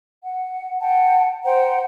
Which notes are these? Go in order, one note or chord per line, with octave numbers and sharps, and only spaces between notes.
F#5
F#5 G5 A5
C5 F#5 G5 A#5